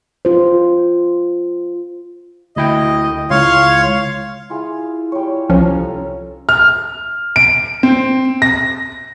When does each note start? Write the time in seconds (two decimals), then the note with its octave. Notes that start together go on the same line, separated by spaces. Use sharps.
0.25 F4 C5
2.56 D2 E4 D#5 G5
3.30 C#2 E4 C#5 F5 C6
4.50 E4 F4 G#4
5.12 G3 C#5
5.50 C2 F3 C#4 A4 A#5
6.49 F6
7.36 D7
7.83 C4
8.42 A#6